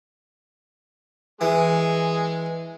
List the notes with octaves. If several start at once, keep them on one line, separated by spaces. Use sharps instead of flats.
E3 G#3 G#4